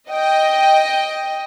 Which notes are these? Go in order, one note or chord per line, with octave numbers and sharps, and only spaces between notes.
D#5 G5